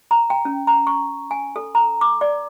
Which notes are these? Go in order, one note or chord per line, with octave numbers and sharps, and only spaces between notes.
A#5
G5
C#4
A#5
C#6
G#5
A4
A#5
D6
D5